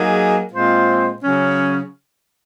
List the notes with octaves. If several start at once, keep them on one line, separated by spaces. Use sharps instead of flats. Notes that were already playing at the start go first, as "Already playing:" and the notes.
Already playing: F#3 A#3 D#4 G#4
A#2 G#3 C4 F4 C5
C#3 F#3 C#4